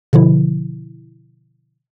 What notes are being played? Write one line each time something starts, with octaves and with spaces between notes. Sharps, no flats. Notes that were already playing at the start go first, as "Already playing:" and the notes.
B2 D3 F3 E4